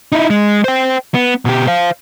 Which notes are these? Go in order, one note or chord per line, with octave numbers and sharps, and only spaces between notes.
D#4 E4
G#3
C5 G5
B3
B2 G4
C5 F5